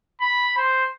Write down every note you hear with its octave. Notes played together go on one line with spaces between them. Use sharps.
B5
C5